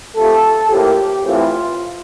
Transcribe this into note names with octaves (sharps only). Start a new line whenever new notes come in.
C3 F3 A3 A4
A2 F3 A#3 G4
A2 E3 A3 C4 F4